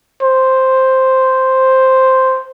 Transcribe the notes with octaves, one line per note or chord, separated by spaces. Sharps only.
C5